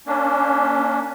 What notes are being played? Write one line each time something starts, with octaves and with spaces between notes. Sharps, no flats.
A#3 C#4 D4